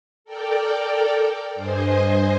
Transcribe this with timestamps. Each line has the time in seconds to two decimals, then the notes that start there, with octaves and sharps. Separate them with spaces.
0.24 A4 A#4 D5 G5
1.55 G2 C5 D#5 G#5